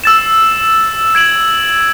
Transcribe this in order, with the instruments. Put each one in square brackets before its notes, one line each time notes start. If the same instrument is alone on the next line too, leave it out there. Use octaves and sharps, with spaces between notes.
[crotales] E6 A6 E7
G#6 D7 F#7